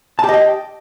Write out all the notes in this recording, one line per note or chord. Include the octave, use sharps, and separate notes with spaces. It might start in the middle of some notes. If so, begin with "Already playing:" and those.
G4 D#5 G5 A5